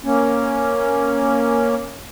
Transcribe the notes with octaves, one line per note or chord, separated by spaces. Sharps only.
A#3 C#4